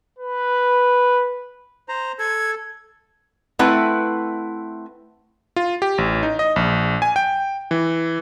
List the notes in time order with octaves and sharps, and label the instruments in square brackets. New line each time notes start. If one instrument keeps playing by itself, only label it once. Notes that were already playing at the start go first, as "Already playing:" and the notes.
[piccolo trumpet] B4
[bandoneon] C5 A#5
[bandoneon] A4 [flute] G#6
[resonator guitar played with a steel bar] A3 C4 E4 B4 F#5
[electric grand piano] F4
G4
A1
D#4
D#5
A#1
G#5
G5
E3